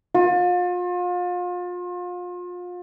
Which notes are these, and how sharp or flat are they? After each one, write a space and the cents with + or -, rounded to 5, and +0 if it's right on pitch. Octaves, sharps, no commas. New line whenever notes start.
F4 +35